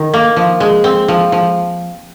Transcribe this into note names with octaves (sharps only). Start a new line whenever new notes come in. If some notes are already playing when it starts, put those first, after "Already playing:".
Already playing: D#3
A#3
F3
G#3
C4
F3
F3